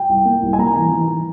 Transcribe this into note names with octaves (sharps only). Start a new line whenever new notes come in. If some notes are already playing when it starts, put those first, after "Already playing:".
Already playing: G5
C2
A#3
C2
G#5
A#3 A#5
E3
E3
E3